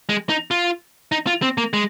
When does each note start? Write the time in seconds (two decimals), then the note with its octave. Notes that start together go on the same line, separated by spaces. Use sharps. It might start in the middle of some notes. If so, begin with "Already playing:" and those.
0.09 G#3
0.29 D#4
0.51 F4
1.12 D#4
1.27 F4
1.42 C4
1.58 A#3
1.73 G#3